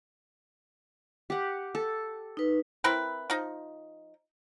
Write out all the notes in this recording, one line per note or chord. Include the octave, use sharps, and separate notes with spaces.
G4 F#5
A4
D#4 B4
C4 E4 A#4 B4
F3 D#4